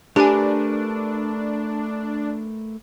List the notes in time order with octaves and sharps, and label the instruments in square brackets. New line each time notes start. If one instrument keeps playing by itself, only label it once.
[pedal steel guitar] A3 A#4 B4 [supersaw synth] D4 [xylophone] G4 G#5